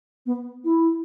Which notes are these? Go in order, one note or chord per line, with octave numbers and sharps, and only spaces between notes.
B3
E4